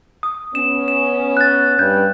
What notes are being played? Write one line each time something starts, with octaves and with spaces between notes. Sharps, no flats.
D#6
B3 C#4 E7
E7
F#6 A6
G2 G6